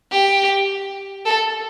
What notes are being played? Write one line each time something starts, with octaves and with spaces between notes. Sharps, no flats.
G4
A4